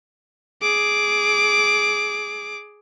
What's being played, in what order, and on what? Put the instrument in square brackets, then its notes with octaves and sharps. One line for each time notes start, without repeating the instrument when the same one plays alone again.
[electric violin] G#4 D6